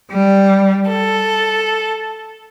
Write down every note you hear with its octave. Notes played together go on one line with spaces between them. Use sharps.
G3
A4